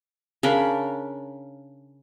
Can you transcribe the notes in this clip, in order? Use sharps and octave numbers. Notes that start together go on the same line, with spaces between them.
C#3 D4 A#4 B5